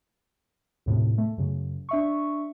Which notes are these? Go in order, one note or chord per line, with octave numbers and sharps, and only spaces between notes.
D#2 A2 C3
A3
F#2 C#3
D4 E5 C#6